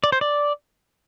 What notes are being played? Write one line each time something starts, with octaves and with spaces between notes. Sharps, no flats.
D5
C5
D5